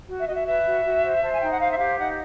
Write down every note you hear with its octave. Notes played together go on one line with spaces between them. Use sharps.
F#4
E5
F#4 D#5
E5
B4 E5
F#4
F#4
C5
C5 A5
G#5
D#4 G5
F#5
C5 F5
E5
G4 F5
D#4 F#5